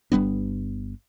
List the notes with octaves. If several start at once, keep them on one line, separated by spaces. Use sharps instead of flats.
G1 G3 B3 D4